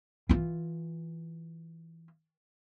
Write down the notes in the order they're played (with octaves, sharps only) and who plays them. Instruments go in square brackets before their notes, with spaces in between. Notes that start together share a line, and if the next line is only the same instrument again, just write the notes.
[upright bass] E3 F4